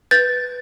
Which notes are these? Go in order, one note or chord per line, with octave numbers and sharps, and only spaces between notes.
B4 G6 A6